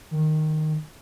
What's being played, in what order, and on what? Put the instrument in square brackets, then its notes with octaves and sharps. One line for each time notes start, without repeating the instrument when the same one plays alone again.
[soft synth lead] D#3